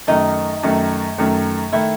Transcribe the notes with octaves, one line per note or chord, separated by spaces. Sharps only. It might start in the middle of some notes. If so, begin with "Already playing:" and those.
F#2 D#3 A3 D#4
F#2 D#3 A3
F#2 D#3 A3
D#3 A3 E4